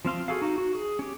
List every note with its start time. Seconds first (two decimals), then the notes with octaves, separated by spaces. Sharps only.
0.05 F3 C4 F5 C6
0.28 F#4 G#4 A4 F5
0.42 D#4 F#4
0.58 F#4
0.75 G#4
0.99 C#4 G4